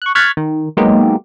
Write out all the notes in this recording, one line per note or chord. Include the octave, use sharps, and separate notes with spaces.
C#6 F#6
C#6 F6 F#6 G#6 A6 B6
D#3
F#3 G#3 A#3 B3 D#4 G4